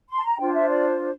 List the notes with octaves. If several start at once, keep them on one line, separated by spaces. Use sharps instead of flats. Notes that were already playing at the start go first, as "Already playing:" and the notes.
C6
A5
A#5
D4 F4 C5 G5
E5
D5